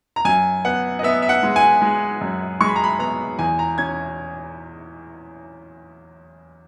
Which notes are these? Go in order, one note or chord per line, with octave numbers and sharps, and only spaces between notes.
A#5
F#2 G#5
B3 F#5
D#5
B3 E5
E5
F#5
G#3
G#5
G#3
F#2
G#3 C#6
B5
A#5
B5
B3 A#5
E2 G#5
A#5
C#4 G#6